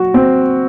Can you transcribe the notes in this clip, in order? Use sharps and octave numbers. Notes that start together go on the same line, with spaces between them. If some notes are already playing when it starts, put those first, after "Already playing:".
Already playing: F#3 F#4
C4